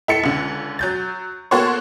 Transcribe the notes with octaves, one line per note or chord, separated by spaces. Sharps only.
E4 A4 C#7
C#2 D3
F#3 G6 A6
A#3 B3 F#4 A4 C5 C#5